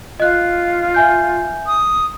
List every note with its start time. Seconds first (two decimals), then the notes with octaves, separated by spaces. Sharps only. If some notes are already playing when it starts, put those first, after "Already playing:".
0.20 F4 D#5 F#6
0.94 E5 G#5 G6
1.67 D#6